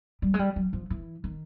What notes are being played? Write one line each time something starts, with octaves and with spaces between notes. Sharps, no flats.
G3
G#3
G3
F#3
F3
E3
D#3